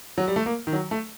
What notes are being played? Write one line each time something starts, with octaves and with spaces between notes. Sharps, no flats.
F#3
G3
A3
A#3
D#3
F#3
A3